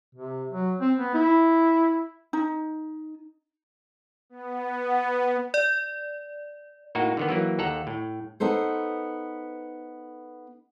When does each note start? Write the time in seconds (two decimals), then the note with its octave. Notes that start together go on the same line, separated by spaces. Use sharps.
0.15 C3
0.51 F#3
0.80 C4
0.99 B3
1.14 E4
2.33 D#4
4.30 B3
5.54 D5
6.95 A2 A#3 D#4 F#4
7.17 D3 D#3 B3
7.29 E3 F#3 A#3
7.59 D#2 A4 F#5 A#5
7.87 A2
8.40 B3 D#4 A4 C5